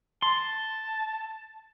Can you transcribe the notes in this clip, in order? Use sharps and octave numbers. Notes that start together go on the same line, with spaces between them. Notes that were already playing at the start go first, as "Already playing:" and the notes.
A5 C6